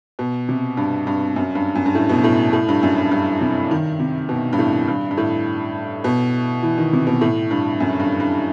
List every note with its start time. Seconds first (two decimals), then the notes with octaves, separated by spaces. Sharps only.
0.19 B2
0.49 C3
0.77 G2
1.07 G2
1.36 F#2
1.55 G2
1.75 F#2
1.86 G2
1.95 A2
2.09 B2
2.24 A2
2.53 A2
2.69 G2
2.83 F#2
2.98 G2
3.12 G2
3.41 C3
3.71 D#3
4.00 C3
4.29 B2
4.53 G2
4.59 A2
4.88 G2
5.11 G2
5.17 A2
6.04 B2
6.63 E3
6.78 D#3
6.93 C3
7.07 B2
7.21 A2
7.51 G2
7.80 F#2
8.00 G2
8.20 G2